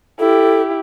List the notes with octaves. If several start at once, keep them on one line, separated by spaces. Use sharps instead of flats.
E4 G4 A4